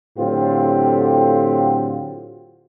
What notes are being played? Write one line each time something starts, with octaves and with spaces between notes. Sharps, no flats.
A2 D3 F#3 C4 F4 G4